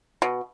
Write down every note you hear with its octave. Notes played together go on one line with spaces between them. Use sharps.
B2